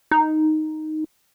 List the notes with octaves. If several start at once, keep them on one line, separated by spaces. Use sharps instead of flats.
D#4